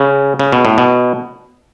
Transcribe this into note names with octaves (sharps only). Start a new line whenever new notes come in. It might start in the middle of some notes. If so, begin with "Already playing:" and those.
Already playing: C#3
C#3
B2
A2
B2